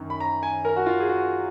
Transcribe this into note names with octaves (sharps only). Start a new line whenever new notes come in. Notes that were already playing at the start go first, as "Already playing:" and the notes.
Already playing: F#2 D#3
B5
A#5
G#5
A#4
F#4
F4
G#4
F#4